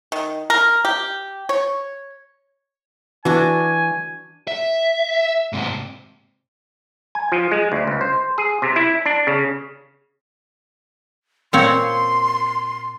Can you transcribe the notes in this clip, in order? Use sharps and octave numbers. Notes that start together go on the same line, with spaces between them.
D#3
A#4
G4
C#5
E3 D4 F#4 G#5
E5
G#2 C3
G#5
F3
G#3
D2
C#2
C5
G#4
C3
E4
D4
C#3
A#2 C4 C#5 C6